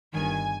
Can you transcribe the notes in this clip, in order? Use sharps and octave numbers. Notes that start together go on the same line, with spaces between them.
G1 G2 D#3 G#5